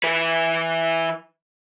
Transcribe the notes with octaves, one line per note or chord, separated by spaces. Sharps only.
E3 B4